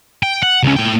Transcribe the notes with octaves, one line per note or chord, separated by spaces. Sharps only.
G5
F#5
C#2 C#4
A2 G5